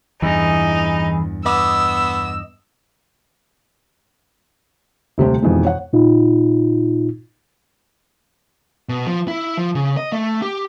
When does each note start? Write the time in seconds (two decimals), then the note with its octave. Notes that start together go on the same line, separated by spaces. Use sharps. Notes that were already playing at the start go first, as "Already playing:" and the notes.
0.22 E2 G2 E3 D#4 G#4
1.46 B3 D#5 D6 E6
5.18 D#1 C3 A3 G4 C5
5.42 F2 B2 D#3 E3 G#3
5.64 C#5 F#5
5.93 A#2 D#4 F4
8.89 B2
9.07 F3
9.28 E4
9.57 F3
9.75 C#3
9.97 D#5
10.12 A3
10.42 G4